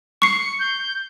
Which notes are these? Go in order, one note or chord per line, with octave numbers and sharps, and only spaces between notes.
C#6 C7 C#7
G6